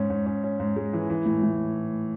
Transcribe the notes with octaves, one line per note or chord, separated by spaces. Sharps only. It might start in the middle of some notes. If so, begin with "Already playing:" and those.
Already playing: G#2 C#4
G#2
C#4
C#4
G#2
G#3
E3
E3
A2
A2